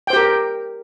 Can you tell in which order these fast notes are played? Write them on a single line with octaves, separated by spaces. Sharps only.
G5 C5 G4 A#4